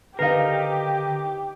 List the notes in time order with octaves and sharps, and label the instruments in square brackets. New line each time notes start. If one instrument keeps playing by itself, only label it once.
[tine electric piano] D3 C7 [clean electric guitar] D#4 A#4 [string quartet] G4 [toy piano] B4 F5